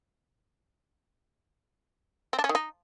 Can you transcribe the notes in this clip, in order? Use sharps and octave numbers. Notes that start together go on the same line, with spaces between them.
C4
D4
C#4
D#3
D#4